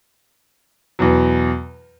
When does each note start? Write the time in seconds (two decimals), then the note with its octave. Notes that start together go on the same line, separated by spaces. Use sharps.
0.99 E2 B2 F#3